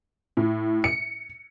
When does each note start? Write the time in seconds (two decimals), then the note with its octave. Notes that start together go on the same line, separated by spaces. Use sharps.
0.37 A2
0.84 C#7